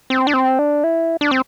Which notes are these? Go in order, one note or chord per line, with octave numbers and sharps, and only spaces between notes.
C4
D4
C4
D4
E4
D4
C4